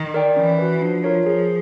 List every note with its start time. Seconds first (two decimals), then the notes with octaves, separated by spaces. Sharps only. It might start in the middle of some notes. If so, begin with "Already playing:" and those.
Already playing: D#3
0.14 A#4 D5 G5
0.36 E3 C#4
0.59 F#4 B4
0.81 F3 D4
1.04 F4 A#4 C#5
1.26 F3 G#4